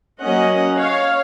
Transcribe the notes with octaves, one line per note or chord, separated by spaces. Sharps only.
F#3 A#3 C#4 D#5 F#5
C#5 F5